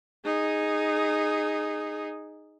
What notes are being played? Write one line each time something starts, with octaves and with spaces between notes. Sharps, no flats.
D#4 G#4